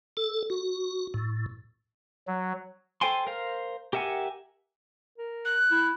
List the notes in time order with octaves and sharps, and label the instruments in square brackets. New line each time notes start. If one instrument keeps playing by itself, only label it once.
[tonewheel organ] A4
F#4
A2
[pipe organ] F#3
[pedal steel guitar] A4 C5 G5 G#5 C6
A#4 C5 F5
G4 A#4 E5 F#5 G#5
[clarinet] A#4
[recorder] F#6
[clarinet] E4